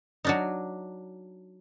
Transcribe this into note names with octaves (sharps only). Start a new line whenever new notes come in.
F#3 D4 D#4